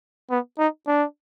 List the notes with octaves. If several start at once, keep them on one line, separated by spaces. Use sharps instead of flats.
B3
D#4
D4